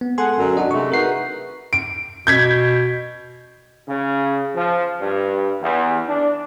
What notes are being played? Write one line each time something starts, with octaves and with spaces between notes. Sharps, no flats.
B3
G#3 A4 F#5 G#5 C6
F#2 D3
D4 F#4 D#5
C3 G#3 A3 C#6
D#4 F#4 A#4 B4 C7
D7
B2 G6 G#6 B6
C#3
F3
G2
E2
D4